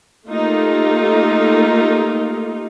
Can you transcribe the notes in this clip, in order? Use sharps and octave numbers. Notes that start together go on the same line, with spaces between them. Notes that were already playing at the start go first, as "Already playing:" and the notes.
A3 A#3 D#4 F4 G4